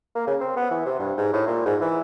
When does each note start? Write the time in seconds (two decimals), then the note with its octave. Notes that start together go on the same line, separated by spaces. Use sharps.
0.15 A#3
0.27 C#3
0.40 C4
0.56 B3
0.71 E3
0.86 C3
0.99 G2
1.17 G#2
1.33 A2
1.47 A#2
1.66 G#2
1.81 E3